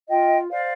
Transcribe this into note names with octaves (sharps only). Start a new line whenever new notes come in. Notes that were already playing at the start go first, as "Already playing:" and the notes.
F4 D#5 G5
C5 D5 F5